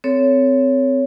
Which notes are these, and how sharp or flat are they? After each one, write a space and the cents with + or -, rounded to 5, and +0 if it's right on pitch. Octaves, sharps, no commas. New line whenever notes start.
C4 -20 A4 +0 C#5 +10